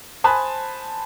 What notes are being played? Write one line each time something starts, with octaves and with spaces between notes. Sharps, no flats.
C5 G#5 A5 B5 D#6 F#6